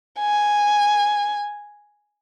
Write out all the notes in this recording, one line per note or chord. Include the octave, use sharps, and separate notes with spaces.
G#5